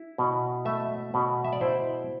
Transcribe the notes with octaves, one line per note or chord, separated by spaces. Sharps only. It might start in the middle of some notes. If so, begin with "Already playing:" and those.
Already playing: E4
B2
A3 E5
B2
E5
D5
E4 C5